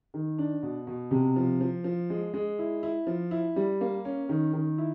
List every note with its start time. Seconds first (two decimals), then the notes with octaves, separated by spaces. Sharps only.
0.14 D#3
0.39 D4
0.63 B2
0.87 B2
1.11 C3
1.36 F3
1.61 F3
1.84 F3
2.10 G#3
2.34 G#3
2.59 E4
2.83 E4
3.07 F3
3.31 E4
3.56 G3
3.81 A#3
4.05 C#4
4.29 D#3
4.53 D#3
4.78 E4